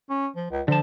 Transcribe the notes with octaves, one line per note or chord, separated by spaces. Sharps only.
C#4
F3
C#2
D3 F3 A5